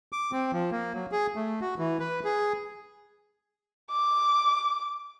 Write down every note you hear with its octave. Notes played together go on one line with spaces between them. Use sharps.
D6
C4
F3
A#3
F#3
G#4
A3
F#4
E3
B4
G#4
D6